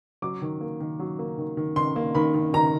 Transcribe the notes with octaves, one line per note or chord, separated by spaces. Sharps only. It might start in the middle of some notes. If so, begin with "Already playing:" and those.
F#3 D6
D#3
A#3
D#3
F#3
A#3
D#3
D#3
D#3 C6
A#3
D#3 B5
D#3
D#3 A#5